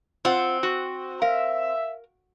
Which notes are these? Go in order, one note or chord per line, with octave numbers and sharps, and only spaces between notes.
C4 F4 F#5
F#4
A#4 E5 F5